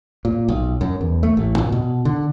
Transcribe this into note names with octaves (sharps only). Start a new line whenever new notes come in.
A#2
B1
F#2
E2
A3
A1
A#2
B2
D3